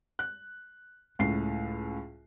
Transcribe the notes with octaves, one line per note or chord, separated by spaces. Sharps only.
F#6
C#2 A2 C7